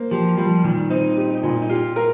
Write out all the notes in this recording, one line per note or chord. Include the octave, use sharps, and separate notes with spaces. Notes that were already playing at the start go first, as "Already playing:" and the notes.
Already playing: A#3 C5
F3 G4
F3 G3
A#2 D#3
C4 D#4
G4
A#2
D#4
F4 G4
F4 A#4